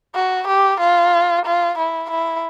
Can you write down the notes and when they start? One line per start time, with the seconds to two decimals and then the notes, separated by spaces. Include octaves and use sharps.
0.15 F#4
0.47 G4
0.80 F4
1.45 F4
1.78 E4
2.11 E4